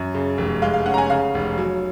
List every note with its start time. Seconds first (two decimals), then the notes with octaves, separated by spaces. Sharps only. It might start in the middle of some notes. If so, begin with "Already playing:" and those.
Already playing: F#2
0.14 C#3
0.38 F1
0.62 G#3 F5
0.73 F5
0.86 C#4 F#5
0.94 A#5
0.98 G#5
1.10 C#3 F5
1.35 F1
1.58 F#3